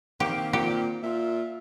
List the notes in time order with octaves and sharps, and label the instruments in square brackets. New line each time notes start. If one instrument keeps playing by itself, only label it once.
[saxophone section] D#3 A#3 C4 [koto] G4
[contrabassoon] A#2 [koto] G4
[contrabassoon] A#2 [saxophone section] F4 E5